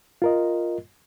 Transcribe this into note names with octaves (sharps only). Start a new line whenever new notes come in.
F4 A#4 D#5